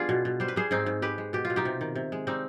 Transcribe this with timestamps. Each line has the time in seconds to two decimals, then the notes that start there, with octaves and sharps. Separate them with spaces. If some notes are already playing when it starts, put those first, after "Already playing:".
Already playing: G3 B3 D4 F4 G#4
0.09 B2
0.25 B2
0.40 G3 C5
0.48 B4
0.56 G3 G#4 C5
0.71 G#2 C4 D#4
0.86 G#2
1.02 G#3 G4 B4
1.18 G#3
1.33 B2 G4
1.45 F4
1.50 B2
1.56 D#4 G4
1.65 C3
1.81 D#3
1.95 C3
2.12 G#3
2.27 G3 C4 D#4